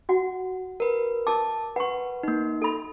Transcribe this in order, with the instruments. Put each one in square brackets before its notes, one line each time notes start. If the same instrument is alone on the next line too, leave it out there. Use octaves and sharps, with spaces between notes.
[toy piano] F#4 F#5
[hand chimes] A#4 B4
[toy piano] A#4 D6 [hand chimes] A5
[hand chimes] B4 [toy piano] F#5 C#6
[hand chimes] A#3 D#4
[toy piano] A4 B5